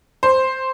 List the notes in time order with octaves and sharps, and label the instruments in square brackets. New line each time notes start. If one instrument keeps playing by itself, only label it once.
[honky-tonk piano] C5